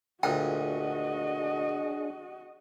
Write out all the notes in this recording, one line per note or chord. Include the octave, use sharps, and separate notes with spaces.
D2 A#2 D4 F#4 G#4 D#5 G5 D#6